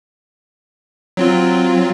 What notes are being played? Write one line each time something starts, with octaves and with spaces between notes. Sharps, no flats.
F#3 C4 F4